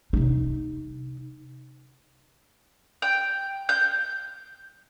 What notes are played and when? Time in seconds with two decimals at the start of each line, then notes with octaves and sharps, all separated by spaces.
0.13 C3 D#4
3.02 G5
3.69 G6